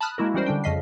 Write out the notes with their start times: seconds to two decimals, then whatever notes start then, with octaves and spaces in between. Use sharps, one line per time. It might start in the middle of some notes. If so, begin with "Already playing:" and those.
0.01 A5 B5 D#6 F6 F#6
0.18 G#3 A#3 E4 F#4 A#4
0.34 E3 G3 C#4 F#4 A#4 C5
0.46 D3 G3 D4 G5
0.64 F2 C#3 F3 D#5 B6 C7